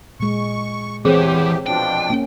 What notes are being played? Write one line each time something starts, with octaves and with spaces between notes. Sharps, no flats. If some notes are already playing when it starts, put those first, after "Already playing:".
A#2 G#3 C#6
E2 E3 C4 G4 G#4 C5 C#5
B2 F3 D4 G5
A#3 C#4